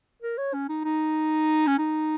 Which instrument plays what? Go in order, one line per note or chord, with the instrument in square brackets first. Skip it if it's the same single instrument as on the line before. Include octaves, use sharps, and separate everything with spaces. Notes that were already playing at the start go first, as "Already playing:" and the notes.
[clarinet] A#4
C#5
C#4
D#4
D#4
C#4
D#4